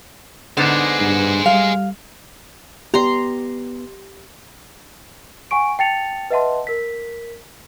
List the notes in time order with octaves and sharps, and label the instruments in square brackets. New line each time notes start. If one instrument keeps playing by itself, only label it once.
[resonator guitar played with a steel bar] D3 B3 D#4 [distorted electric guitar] G#4 C5
[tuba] G2
[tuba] G3 [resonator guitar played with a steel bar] F5
[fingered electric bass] B3 [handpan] G4 D5 [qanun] A#5 C6
[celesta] F#5 G#5 C#6 D7
G5 A5 A6 C#7 F7
B4 D#5 E5 F#5 A5 C6
A#4 B6